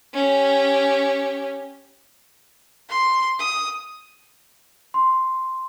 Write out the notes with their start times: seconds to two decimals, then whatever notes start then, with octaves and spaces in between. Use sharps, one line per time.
0.14 C#4 G4
2.89 C6
3.39 D#6
4.94 C6